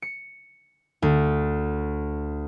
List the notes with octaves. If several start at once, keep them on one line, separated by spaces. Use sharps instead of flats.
C#7
D2